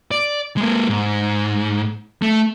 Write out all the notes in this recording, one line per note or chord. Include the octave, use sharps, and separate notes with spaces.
D5
G#3 A#3
G#2
A3